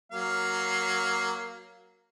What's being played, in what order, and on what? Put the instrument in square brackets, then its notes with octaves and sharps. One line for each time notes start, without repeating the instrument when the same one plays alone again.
[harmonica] F#3 A#3 F5